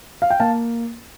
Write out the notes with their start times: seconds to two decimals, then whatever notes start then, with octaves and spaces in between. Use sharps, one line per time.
0.22 F5
0.30 G5
0.40 A#3 F5 A5